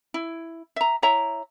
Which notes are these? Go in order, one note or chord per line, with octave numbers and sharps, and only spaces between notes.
E4
E5 A#5
E4 C#5 E5 A#5